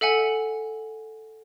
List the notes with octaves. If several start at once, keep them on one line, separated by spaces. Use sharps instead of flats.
A4 E5 F#5 G#5